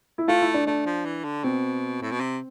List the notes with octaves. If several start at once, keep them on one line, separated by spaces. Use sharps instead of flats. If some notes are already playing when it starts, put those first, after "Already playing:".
E4
A3 F4
E4
D4
A3 D4
F3
E3
D3
B2 C4
A2
B2
C3